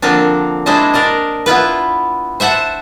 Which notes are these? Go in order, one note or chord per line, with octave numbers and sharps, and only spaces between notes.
D3 F3 A#3 C4 D4
G#3 D4 E4 C5 D#5
D4 A#4 D5 D#5
B3 E4 F4 B4
C5 E5 F#5 A5